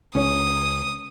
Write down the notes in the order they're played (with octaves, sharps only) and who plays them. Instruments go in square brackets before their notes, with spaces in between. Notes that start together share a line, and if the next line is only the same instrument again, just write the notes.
[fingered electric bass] C#2 [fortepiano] C#4 C#5 [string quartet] D#6